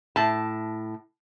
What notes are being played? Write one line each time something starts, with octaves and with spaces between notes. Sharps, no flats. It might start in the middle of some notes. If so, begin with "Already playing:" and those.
A2 A5